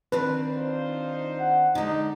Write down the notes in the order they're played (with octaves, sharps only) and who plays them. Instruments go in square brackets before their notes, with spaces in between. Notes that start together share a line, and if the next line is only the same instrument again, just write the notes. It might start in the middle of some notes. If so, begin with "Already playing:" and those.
[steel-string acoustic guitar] D#3 C4 D4 [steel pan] B4
[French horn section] D#4 F4 C5
[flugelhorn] F#5
[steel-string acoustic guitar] D3 G#3 [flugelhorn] D#4